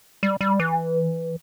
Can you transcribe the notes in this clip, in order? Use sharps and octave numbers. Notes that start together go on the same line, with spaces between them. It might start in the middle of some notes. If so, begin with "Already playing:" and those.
G3
G3
E3